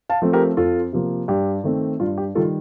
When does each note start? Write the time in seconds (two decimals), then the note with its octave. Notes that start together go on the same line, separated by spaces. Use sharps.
0.09 F5 A5
0.22 F3 A3 C4
0.33 G4 A#4
0.57 F2 F4 A4
0.93 C3 F3 A#3
1.28 G2 G4
1.64 D#3 A3 C4
2.00 G2 F4
2.18 G4
2.35 D#3 G3 F4 A4